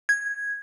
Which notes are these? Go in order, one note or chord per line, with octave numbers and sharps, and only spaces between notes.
G#6